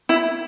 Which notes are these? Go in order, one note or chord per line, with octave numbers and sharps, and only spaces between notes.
E4